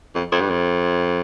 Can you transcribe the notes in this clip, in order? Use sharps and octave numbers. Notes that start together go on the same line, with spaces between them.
F2
F2
G2
F2